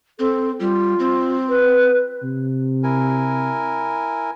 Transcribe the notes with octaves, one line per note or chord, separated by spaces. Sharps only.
C4 A4
G3 F4
C4
B4
C3
E4 A#4 G#5